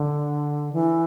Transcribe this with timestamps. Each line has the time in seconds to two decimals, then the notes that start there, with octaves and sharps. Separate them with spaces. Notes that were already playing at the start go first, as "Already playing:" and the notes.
Already playing: D3
0.73 E3